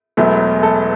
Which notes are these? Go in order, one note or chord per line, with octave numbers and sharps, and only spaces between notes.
E1 E2 B2 F#3 A3
A4